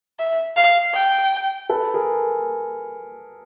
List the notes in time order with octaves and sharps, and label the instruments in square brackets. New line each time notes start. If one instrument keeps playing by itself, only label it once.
[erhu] E5
F5
G5
[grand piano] A4 B4
G#4 A#4